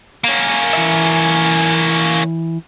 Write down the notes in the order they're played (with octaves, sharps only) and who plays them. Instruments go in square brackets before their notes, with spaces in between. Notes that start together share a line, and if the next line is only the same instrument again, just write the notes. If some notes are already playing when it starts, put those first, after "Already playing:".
[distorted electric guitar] A#3 C#4
[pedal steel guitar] E3 E5